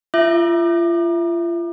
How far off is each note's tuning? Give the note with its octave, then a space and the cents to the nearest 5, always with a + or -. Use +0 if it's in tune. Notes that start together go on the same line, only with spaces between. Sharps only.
F4 -35 E5 +0 D6 +35